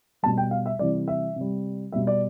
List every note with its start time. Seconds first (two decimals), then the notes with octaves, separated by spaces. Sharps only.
0.23 B2 G3 A5
0.38 G5
0.51 F5
0.66 E5
0.79 C3 E3 G3 D5
1.08 E5
1.36 C3 G3
1.92 B2 G3 E5
2.07 D5